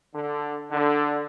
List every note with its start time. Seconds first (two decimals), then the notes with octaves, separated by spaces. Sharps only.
0.14 D3
0.71 D3